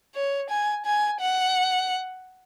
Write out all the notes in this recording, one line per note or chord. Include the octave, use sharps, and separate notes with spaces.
C#5
G#5
G#5
F#5